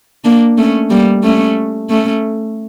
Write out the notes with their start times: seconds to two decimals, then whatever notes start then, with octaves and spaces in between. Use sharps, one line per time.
0.24 A#3 D4
0.57 A3 C#4
0.90 G3 A#3
1.23 A3 C#4
1.89 A3 C#4